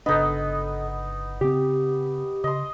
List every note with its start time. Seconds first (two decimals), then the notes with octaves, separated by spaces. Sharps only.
0.06 G1 C#3 B3 D4 D#4 A4 D#5
1.41 C#3 C4 G4
2.44 C#3 D#5 C6